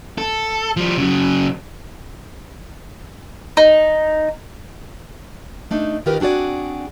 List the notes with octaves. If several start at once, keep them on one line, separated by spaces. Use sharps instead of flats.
A4
F3 G3
C#3 F#3
D#4
A3 D4 D#4
D#3 D#4 F4 G4 A#4 B4
C4 D4 F#4 G#4 D5